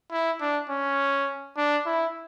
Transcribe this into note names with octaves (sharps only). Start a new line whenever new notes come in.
E4
D4
C#4
D4
E4